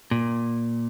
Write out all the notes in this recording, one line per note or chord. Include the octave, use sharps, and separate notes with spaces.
A#2